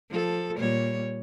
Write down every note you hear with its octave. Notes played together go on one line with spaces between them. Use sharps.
F3 A4
A#2 G3 C#5